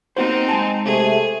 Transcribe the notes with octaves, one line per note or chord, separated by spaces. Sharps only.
A#3 C4 D#4 F#4 C5
G#3 G#5 A5
C3 A3 G#4